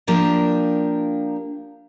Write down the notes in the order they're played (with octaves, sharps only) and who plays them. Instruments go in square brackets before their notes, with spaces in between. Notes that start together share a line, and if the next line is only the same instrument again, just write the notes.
[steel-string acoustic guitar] F3 A#3 D4 G4 A#4